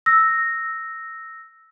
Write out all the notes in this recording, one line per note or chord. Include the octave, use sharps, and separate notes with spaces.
E6 A#6